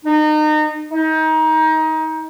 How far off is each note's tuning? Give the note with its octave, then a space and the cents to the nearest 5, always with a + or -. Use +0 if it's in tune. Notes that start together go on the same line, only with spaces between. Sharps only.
D#4 -30
D#4 +25